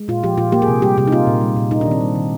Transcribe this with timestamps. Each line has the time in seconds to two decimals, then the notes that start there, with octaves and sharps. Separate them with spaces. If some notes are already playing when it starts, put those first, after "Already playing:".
Already playing: G#3
0.08 A#2 F4
0.23 F3 G4
0.37 A#2 F4
0.52 A#3 G4
0.62 G#4
0.68 C3
0.82 G3 G4
0.97 C3 G4
1.08 D#4
1.12 A#3 F4
1.27 A#2
1.41 G3
1.56 A#2
1.71 A#3 D#4
1.81 D#3 D4
1.91 C4
2.01 G3
2.15 D#3